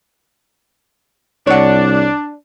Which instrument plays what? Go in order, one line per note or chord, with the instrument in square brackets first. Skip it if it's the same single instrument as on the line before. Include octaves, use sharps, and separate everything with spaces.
[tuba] C2 [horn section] D4 [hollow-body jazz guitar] C#5 F#5